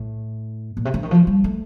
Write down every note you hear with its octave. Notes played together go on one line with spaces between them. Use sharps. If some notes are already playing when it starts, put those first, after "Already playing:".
Already playing: A2
A#2
C3
D3
D#3
F3
G3
A3